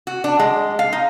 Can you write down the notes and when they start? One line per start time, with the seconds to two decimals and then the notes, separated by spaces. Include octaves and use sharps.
0.07 F#4
0.24 D4
0.39 G#3
0.79 F5
0.93 D#4